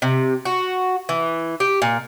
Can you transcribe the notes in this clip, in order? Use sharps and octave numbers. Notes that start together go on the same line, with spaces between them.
C3
F#4
E3
G4
A#2